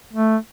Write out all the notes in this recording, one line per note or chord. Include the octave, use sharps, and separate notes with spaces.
A3